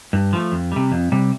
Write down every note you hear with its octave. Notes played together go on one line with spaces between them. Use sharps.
G2
F3 A3
F2
C3 G3
F2
C3 G3